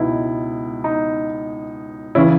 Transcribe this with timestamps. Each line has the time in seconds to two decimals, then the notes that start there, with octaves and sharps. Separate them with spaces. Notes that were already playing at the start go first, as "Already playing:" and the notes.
Already playing: C#2 B2 D#4 E4
0.84 D#4
2.15 C#3 E3 C#4 E4